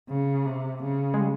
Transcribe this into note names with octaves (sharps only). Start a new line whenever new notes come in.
C#3
C3
C#3
G#3
G3